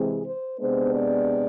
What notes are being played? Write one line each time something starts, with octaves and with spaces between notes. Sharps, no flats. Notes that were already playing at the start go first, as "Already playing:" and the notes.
Already playing: C3 E3 G#3 C4 G#4
C5
C3 G#3 B3 D4 C5
D5